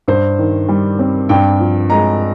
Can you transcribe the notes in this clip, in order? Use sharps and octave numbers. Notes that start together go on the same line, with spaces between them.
G2 C5
D#3
G3
C4
G2 G5
F3
G#3 A#5